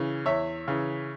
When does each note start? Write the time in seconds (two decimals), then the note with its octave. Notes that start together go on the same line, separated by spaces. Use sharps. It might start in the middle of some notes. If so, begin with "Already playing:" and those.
Already playing: C#3 E3
0.26 E2 C#5 E5
0.68 C#3 E3